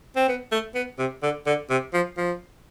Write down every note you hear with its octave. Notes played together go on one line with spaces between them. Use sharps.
C4
B3
A3
B3
C3
D3
D3
C3
F3
F3